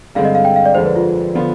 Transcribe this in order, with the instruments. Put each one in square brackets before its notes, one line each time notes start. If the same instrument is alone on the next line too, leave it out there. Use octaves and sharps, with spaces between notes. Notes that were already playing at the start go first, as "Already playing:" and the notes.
[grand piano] G2 D3 G#3 C4 [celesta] F5
[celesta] D#5
F5
G5
F5
D5
[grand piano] F2 D3 G#3 D4 [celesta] C5
[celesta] B4
F4
[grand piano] D3 F3 B3 F4